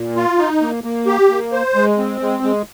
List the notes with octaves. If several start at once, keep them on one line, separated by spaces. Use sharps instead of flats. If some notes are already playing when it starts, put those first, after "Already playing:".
Already playing: A#2
F4
D#4
A#3
A#3
G4
A#3
C5
G#3
C4
G#3
G#3